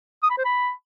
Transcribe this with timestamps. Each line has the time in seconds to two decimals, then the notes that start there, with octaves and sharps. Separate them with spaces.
0.23 D#6
0.30 B5
0.37 C5
0.45 B5